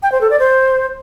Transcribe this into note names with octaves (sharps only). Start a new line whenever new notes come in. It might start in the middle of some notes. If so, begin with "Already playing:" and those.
G5
C5
A4
D5
C5